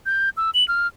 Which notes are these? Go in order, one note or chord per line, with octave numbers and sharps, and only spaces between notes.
G6
E6
F#7
F6